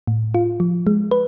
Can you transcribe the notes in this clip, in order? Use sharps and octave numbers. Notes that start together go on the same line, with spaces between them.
A2
F4
F3
G#3
B4